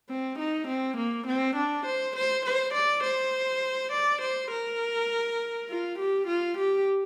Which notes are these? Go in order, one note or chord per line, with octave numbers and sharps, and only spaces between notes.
C4
D#4
C4
A#3
C4
D4
C5
C5
C5
D5
C5
D5
C5
A#4
F4
G4
F4
G4